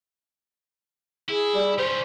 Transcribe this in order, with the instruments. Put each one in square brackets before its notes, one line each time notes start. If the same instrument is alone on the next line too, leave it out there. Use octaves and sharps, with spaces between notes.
[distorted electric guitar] E4 [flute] G#4
[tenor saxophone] G3
[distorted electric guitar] G3 C#4 [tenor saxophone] C5